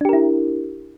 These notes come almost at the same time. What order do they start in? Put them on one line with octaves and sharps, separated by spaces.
D4 G4 A#4 E4